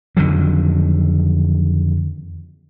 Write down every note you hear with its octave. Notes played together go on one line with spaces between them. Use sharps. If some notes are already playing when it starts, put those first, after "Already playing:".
F2 D3 D#3 F#3